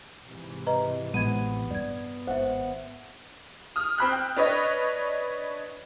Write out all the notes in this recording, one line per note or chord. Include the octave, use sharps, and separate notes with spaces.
G#2 C3 E3
B4 D#5 A#5
A1 A2 G#3 B3 G#6 D#7
G2 D5 G#6
G#1 C5 E5 F#5
D#6 F6
C4 B5 F#6
G5
D4 B4 C#5 D#5